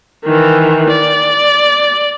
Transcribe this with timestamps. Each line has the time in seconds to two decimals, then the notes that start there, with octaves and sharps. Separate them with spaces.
0.25 D#3 E3
0.89 D5